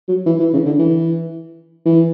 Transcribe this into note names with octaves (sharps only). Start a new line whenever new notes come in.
F#3
E3
E3
C#3
D3
E3
E3